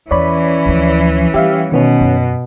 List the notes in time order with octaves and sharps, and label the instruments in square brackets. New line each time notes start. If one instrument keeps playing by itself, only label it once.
[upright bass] E2 [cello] E3 C#4 [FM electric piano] C#5 D5 B5
[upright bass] D2 F3
[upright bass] G3 [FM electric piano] G4 E5 F5
[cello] B2 [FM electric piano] D#3 B3 C#4
[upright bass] F#2